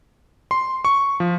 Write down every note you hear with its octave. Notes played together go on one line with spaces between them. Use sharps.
C6
C#6
F3